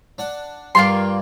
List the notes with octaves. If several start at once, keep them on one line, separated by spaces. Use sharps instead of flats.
D4 F#5
G2 G3 A#3 F4 C6